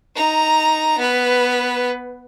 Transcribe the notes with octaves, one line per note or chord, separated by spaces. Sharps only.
D#4 A#5
B3 B4